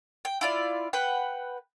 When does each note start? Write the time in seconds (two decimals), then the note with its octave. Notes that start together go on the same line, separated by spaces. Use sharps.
0.25 G5
0.41 E4 F4 D5
0.93 B4 F#5 G5